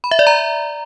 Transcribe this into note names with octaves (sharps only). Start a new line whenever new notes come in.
B5
E5
D5
A#5